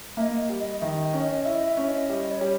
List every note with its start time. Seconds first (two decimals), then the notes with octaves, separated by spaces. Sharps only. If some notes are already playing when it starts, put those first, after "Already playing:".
0.17 A#3 E5
0.21 D#5
0.49 G3
0.60 D#5
0.81 D#3 D#5 E5
1.13 C#4
1.45 E4 D#5
1.67 E5
1.77 C#4
1.88 D#5
2.10 G3 D#5
2.31 C#5
2.41 G3